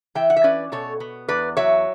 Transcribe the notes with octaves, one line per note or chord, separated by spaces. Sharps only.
E3 E5 G5
F#5
E5
C#4 B4 D5
B2 A4 C#5
B3
E2 B4 D5
F#3 C#5 E5